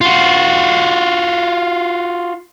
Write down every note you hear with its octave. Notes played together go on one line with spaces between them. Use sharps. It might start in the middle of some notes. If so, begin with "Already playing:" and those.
F4 F#4